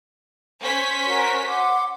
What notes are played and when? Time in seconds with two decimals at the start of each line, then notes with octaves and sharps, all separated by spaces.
0.62 C#4 C5 B6
1.04 F#4 A#4
1.48 F#5 C6 D6